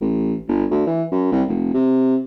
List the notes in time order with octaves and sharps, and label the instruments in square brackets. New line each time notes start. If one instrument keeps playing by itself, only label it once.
[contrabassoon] A1
G1
D2
E3
F#2
C2
F1
C3